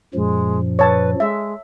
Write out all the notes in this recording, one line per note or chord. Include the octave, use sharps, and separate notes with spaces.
F#2 A#2 F3 G#3
B4 C#5 A5
G#3 E5